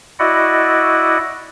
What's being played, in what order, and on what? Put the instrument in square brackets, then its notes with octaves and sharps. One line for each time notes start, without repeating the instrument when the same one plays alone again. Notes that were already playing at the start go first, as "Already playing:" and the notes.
[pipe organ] E4 F#4 D5 D#5 F#5